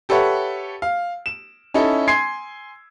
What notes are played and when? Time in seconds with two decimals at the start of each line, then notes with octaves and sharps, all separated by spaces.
0.09 G4 A4 B4 C#5 E5 F#5
0.82 F5
1.26 E7
1.74 C#4 D#4 E4 A4
2.07 G#5 C6 G#6 C7